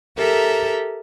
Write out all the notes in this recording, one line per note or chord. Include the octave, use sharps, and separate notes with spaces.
G4 A4 A#4 E5 A#5